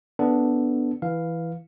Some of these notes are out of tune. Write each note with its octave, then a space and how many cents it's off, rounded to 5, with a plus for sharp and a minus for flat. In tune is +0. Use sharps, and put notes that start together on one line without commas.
B3 +0 D4 -5 A4 +0
E3 +0 F5 +0